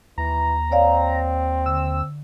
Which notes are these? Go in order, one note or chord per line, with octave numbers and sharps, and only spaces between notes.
D#2 E3 A#5
C4 C#5 D5 F5
D3 E6